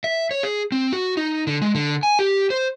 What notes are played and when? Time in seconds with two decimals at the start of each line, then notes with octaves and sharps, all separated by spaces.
0.04 E5
0.31 C#5
0.43 G#4
0.72 C4
0.93 F#4
1.17 D#4
1.47 D3
1.62 G#3
1.75 D3
2.03 G#5
2.19 G4
2.50 C5